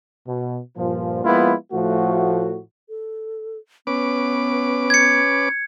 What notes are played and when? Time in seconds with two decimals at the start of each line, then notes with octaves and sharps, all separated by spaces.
0.28 B2
0.77 G2 A#2 F3
1.24 F3 G#3 A#3 B3 E4 F4
1.73 A2 F3 A3 F#4
2.89 A4
3.87 B3 C#4 B4 D6
4.90 G#6 C#7